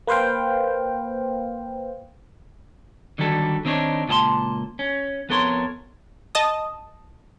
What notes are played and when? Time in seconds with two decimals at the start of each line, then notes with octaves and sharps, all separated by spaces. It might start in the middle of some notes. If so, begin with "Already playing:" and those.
0.07 A#3 B4 C5 F5 G5
3.18 D3 D#3 F#3 G3 A4
3.65 D#3 C4 D4 D#4 C#5
4.08 C#2 A#2 D4 G#4 A5 C6
4.79 C#4
5.29 F2 B3 A4 A#4 C#5 C6
6.35 D#5 A5 D#6